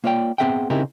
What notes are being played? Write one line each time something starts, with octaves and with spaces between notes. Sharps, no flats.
A#3 F4 C#5 D5 G5
B3 C4 G#4 E5 F#5 G5
C#3 C4 D#4 E4 G4 A#4